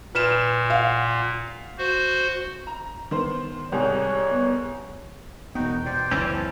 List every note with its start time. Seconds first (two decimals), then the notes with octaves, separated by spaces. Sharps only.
0.15 A#2 B4 F6 E7
0.70 F5 F#5
1.78 F#4 C5
2.67 A#5
3.11 D#3 B3 C5
3.72 C2 G#2 G3 G#4 C#5
4.31 B3
5.55 E1 B3 D#4 F#4 G5
5.86 B2 C5 D5 G5
6.11 F#1 C#2 E3 C4 C#4
6.35 A5